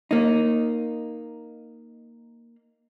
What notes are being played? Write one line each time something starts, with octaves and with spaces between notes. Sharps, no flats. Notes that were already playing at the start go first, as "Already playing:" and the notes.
A#3 D#4